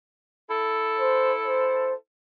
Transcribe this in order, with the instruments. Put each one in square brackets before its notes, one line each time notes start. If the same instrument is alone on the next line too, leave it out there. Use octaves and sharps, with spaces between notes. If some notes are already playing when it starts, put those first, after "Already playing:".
[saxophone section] E4 A4
[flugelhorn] C5
C5